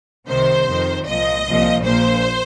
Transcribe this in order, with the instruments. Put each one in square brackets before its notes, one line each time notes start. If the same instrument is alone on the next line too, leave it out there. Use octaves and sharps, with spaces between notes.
[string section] C2 C3 D#3 C5
F2 D#3
C2 A#2 F3 D#5
C2 A#2 F3
A#1 A#2 F3 C5